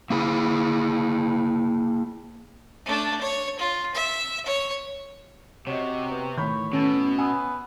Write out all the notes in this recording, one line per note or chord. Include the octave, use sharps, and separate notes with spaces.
A#3 E4 G#4
A3 D4
C#5
F4
E5
C#5
C3 F#4 C#5 D#5
B3
A2 D#3 C#5 B5 G6
B2 C#4 A4
B3 G#5 D#6 E6